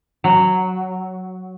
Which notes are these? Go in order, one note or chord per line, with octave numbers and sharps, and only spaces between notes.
F#3